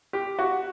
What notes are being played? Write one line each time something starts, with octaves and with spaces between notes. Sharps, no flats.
G4
F#4